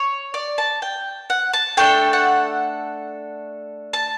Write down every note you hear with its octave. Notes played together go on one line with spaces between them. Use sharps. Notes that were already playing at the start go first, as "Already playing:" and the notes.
Already playing: C#5
D5
A5
G5
F#5
A5
A3 D4 A4 G5
F#5
A5